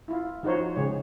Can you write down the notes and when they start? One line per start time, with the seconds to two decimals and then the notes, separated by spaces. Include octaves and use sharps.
0.08 E4 F4
0.43 F3 D#4 F#4 C5 C#5
0.76 C#3 G#3 C#5